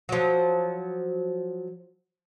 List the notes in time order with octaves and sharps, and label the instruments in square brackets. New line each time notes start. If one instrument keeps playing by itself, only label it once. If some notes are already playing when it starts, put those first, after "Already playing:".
[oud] F3 F#3